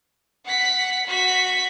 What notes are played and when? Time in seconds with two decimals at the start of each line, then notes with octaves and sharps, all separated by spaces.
0.45 F#5 B6
1.07 F#4 B6